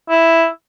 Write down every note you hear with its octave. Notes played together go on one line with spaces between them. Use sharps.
E4